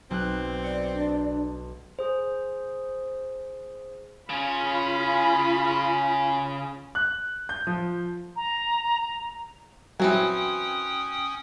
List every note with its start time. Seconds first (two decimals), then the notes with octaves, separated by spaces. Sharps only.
0.11 B1 C4 F#6
0.64 D5 C#7
0.94 D4
1.99 G#4 C5
4.29 C#3 C#4 F4 B5
6.95 F#6
7.49 G6
7.67 F3
8.36 A#5
10.00 E3 F#3 C4 C#4 G5 G#5 D#6